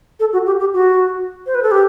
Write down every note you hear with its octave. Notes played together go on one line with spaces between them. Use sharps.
A4
F#4
G4
G4
F#4
C5
B4
A4
G4